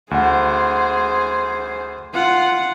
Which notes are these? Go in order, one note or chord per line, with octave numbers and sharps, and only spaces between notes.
D2 G#4 C5 F#5
F4 F#5